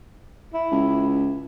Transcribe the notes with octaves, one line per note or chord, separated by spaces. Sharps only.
E4
C#2